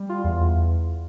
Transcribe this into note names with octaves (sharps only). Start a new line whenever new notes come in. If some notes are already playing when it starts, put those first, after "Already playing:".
Already playing: G3
F4
E2
E2